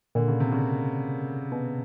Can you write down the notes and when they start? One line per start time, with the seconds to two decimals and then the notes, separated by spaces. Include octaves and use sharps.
0.15 A#2 D3
0.28 C#3
0.40 C3
0.52 C#3
1.52 B2